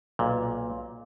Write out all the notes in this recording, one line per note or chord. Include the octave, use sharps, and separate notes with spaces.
B1 A#2